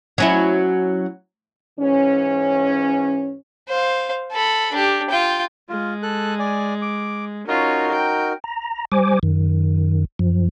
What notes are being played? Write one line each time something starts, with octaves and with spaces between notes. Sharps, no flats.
F#3 C#4 E4
G#2 E3 C#4
C5 F5
A4 B5
D4 G4
F4 G5
G#3 F4
A4 F#6
D5 G#5
D6
C#4 D#4 F4 F#4 A#4
G5
A#5
G3 C5 G#5 D6
F#2 D#3
F#2 F3